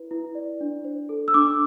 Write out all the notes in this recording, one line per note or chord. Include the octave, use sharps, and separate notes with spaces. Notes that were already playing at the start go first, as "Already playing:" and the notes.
Already playing: E4 B4
E4
D5
D4
C5
A4
E6
D4 D6